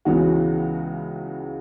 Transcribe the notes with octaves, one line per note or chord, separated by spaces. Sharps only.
C#2 C#3 E3 B3 F#4